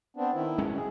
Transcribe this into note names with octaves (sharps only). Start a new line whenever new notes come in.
B3 C4 D4
D#3 E4
D1 G#3 C#4
G#4